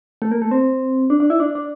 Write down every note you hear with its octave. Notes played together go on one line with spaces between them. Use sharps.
A3
A#3
A3
C4
D4
D4
E4
D4
D4